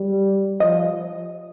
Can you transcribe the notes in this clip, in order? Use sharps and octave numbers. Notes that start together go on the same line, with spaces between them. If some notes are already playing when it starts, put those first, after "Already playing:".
Already playing: G3
F3 D#5